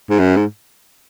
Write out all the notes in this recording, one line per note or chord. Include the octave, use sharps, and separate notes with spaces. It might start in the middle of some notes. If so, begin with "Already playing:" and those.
G#2
F#2
G#2